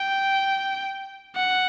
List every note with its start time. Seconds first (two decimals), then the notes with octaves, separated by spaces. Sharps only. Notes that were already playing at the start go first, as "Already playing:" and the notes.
Already playing: G5
1.35 F#5